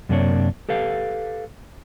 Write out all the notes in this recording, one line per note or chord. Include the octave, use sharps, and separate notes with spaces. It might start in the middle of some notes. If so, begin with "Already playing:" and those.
F#2 C3 A#3 D4 C#5
G4 A4 B4 F5